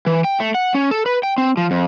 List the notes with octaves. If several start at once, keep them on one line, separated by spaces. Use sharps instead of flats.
E3
G5
A3
F#5
C#4
A4
B4
G5
C4
F3
F2